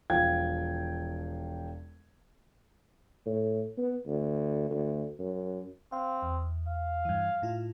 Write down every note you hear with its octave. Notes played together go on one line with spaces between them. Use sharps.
E1 F3 F5 G5 G#6
A2
B3
D2
D2
F#2
C4 F5
E2
F5
G2 E3
A2 E4 F4